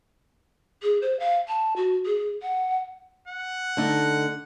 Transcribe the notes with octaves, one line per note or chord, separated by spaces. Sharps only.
G#4
C5
F5
A5
F#4
G#4
F#5
F#5
D3 A3 D#4